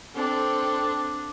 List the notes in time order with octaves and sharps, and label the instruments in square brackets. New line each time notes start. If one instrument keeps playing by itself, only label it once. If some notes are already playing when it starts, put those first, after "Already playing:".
[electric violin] C4 A4 [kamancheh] D4